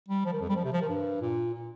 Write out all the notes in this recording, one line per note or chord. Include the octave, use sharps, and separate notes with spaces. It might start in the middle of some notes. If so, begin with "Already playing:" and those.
G3
F3
D#3
F2
G3
F3
C3
F3
D#3
G2
A#2
A#2